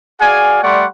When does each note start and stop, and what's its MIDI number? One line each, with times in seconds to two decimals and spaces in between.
0.20 0.61 66
0.20 0.61 68
0.20 0.61 74
0.20 0.61 77
0.20 0.61 80
0.63 0.85 55
0.63 0.85 57
0.63 0.85 74
0.63 0.85 78
0.63 0.85 84
0.63 0.85 85